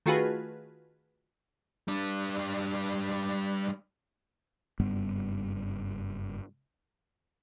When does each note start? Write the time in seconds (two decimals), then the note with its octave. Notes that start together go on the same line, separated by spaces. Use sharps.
0.06 D#3 A3 F4 F#4 G#4 B4
1.88 G3 D4
4.79 F#1 G2 G3 B3